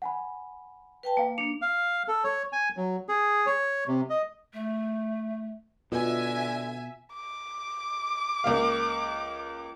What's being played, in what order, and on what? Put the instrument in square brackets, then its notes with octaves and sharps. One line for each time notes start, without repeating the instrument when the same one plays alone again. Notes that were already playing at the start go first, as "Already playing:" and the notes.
[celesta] F#5 G#5 B5
[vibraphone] B4 G5 A5
[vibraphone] A#3 [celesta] F5 A5
[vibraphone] A#3 D4 [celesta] C#7
[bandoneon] F5
A4
C#5
G#5
F#3
G#4
C#5
C3
D#5
[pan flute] A3
[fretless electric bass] B2 [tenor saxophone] D3 [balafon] F4 [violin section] E5 G#5
[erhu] D6
[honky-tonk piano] C#2 A#3 F5